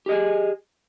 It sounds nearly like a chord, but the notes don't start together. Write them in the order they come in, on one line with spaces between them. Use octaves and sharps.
G4 D#5 G#4